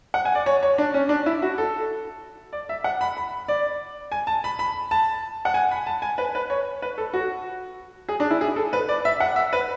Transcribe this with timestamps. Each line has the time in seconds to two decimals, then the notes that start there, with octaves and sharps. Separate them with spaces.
0.14 F#5
0.25 G#5
0.35 D5
0.46 C#5
0.63 C#5
0.78 D4
0.94 C#4
1.09 D4
1.26 E4
1.42 F#4
1.58 A4
2.53 D5
2.69 E5
2.84 F#5
3.01 B5
3.17 B5
3.48 D5
4.12 G#5
4.27 A5
4.44 B5
4.59 B5
4.91 A5
5.45 F#5
5.54 G#5
5.71 B5
5.87 A5
6.02 G#5
6.18 B4
6.35 B4
6.50 C#5
6.82 B4
6.98 A4
7.13 F#4
8.08 G#4
8.20 D4
8.31 E4
8.41 G#4
8.56 A4
8.73 B4
8.89 D5
9.05 E5
9.20 F#5
9.36 E5
9.53 B4